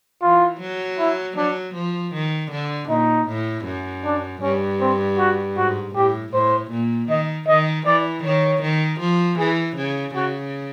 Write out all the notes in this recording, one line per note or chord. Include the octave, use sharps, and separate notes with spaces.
E3 F4
F#3
E4
F#3 D4
F3
D#3
D3
A#2 D#4
A2
F#2
D4
G2 C#4
C4
F#4
G#2 F#4
A2 G4
A2 C5
A#2
D#3 D#5
D#3 D#5
E3 D5
D#3 C#5
D#3
F3
E3 G#4
C#3
C#3 F#4